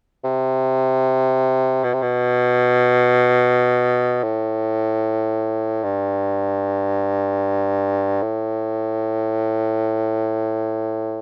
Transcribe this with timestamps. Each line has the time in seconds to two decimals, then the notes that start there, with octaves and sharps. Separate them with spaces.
0.24 C3
1.84 B2
1.93 C3
2.02 B2
4.23 A2
5.84 G2
8.22 A2